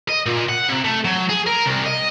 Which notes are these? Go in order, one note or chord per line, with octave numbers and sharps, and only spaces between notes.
D#5
A#2
F#5
C3
A3
F#3
G#4
A#4
C2
D#5